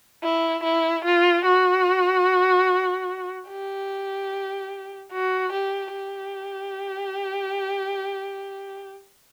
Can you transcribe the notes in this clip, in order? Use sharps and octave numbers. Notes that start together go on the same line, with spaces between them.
E4
E4
F4
F#4
G4
F#4
G4
G4